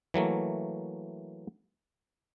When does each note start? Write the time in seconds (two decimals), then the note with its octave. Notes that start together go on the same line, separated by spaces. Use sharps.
0.14 E3 F#3 A3 A#3